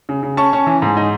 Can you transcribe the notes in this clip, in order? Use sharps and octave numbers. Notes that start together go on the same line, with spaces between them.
C#3
C#3
C#4 A5 C#6
C#4
E3
G#2
D#4